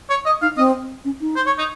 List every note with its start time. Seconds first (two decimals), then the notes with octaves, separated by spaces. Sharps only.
0.10 C#5
0.26 D#5
0.42 D#4 F5
0.57 C4 D#5
1.05 C#4
1.21 D#4
1.36 C5
1.47 C#5
1.58 D#4